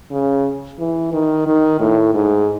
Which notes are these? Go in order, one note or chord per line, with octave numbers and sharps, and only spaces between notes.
C#3
E3
D#3
D#3
A2
G#2